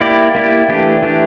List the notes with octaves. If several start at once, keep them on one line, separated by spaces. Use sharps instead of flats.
A#3 E4 G4 D5
A#3 E4 G4 D5
E3 A3 D4 G4
E3 A3 D4 G4